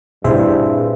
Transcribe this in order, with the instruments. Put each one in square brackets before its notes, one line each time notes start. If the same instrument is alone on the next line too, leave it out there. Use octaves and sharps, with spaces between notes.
[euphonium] G2 [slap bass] A#2 A3 C4 [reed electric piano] E4 G#4 [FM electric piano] C5 E5